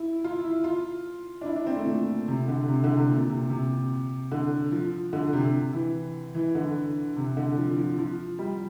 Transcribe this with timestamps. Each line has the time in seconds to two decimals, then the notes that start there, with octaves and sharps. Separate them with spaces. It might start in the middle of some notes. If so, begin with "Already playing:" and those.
Already playing: E4
0.24 F4
0.44 E4
0.64 F4
1.41 D4
1.46 E4
1.56 D4
1.66 C4
1.77 A3
1.86 A#2
2.28 C3
2.48 D3
2.68 C3
2.84 D3
2.96 C3
3.08 A#2
3.30 C3
3.49 C3
4.32 D3
4.72 F3
5.13 D3
5.33 C3
5.73 E3
6.35 E3
6.55 D3
7.17 C3
7.37 D3
7.57 F3
7.78 F3
7.98 F3
8.39 G3